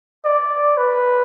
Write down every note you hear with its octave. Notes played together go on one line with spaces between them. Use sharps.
D5
B4